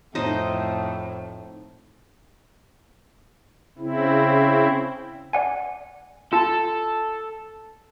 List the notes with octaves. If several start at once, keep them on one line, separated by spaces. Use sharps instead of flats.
F2 A2 D#4 C5 D#5
C#3 C4 E4
D5 F#5 G#5
F4 A4 A5